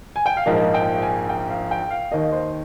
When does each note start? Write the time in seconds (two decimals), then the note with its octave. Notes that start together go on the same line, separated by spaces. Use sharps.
0.16 G#5
0.26 G5
0.37 F5
0.46 A#1 G#2 F3 A#3 D#5
0.74 G5
1.02 G#5
1.29 G5
1.50 F5
1.71 G5
1.91 F5
2.11 D#2 D#3 A#3 D#5
2.32 C5